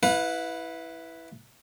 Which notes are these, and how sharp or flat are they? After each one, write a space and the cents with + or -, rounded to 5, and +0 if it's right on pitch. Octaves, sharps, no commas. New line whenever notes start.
E4 -5 B4 +0 F5 +45